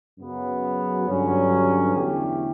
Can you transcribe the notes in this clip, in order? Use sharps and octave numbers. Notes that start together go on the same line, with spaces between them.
F#2 C#3 F#3 B3
G2 D3 F#3 C#4
E2 D3 A3 E4 G4